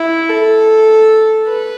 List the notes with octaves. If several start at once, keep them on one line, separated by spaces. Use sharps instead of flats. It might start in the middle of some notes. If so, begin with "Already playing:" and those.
Already playing: E4
A4
B4